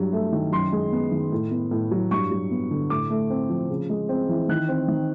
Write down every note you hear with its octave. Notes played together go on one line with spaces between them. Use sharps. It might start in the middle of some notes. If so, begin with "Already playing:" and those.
Already playing: G2 F#3 G3
A3
D#3
F#2 C6
G#3
B3
D#3
A2
B3
A2
F#3
G2 C#6
F#3
B3
D3
A2 D6
A3
C4
F3
C#3
G#3
C4
E3
D#3 F#6
C4
D#3